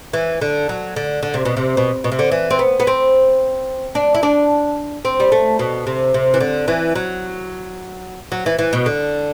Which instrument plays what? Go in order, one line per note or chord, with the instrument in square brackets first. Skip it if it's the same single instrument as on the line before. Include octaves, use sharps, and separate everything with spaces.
[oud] E3
D3
F#3
D3
D3
C3
B2
C3
B2
B2
C3
D3
E3
C4
B3
B3
C4
D4
E4
D4
C4
G3
A3
B2
C3
C3
E3
D3
E3
F#3
F#3
E3
E3
B2
D3